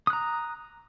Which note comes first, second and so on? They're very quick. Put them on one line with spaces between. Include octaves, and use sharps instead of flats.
D#6 F#6 A#5